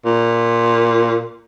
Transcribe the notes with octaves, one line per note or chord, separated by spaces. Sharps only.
A#2